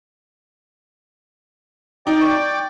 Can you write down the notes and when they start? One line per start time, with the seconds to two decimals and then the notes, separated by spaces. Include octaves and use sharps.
2.07 D#4 D5 G5 D6
2.21 C#6